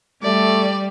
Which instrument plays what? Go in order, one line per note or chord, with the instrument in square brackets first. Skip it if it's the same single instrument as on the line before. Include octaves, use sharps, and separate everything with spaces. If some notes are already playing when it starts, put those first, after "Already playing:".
[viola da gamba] G3 [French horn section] A3 [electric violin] D5